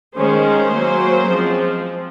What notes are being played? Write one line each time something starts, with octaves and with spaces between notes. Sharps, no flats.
D#3 G#3 C#4 C5
F#3 A#3 C#4
F3 G#3 C4